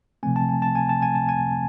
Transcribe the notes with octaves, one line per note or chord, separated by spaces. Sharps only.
C3 F3 A3 C4 G#5
A5
G#5
A5
G#5
A5
G#5
A5
G#5